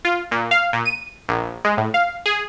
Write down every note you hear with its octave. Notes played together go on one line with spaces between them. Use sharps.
F4
A#2
F5
A#2
D#7
A#1
G#3
A2
F5
G#4